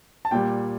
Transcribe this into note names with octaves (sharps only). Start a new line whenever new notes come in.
A5
A#2 G3 G5